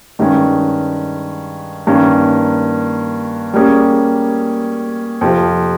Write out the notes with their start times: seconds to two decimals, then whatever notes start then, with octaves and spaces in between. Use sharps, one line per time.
0.19 G2 D#3 G#3 C#4
1.87 G2 D#3 A#3 C#4
3.54 G3 A#3 C#4 G#4
5.21 F2 C3 F3